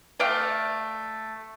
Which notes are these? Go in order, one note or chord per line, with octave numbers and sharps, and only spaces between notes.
A3 D5 F5 G5